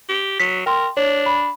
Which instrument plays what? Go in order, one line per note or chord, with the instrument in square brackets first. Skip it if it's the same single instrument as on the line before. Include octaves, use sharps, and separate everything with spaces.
[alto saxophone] G4
[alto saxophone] F#3 [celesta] B6
[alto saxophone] A#4 [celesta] G5 C6
[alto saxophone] D4 [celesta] C#5
[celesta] B5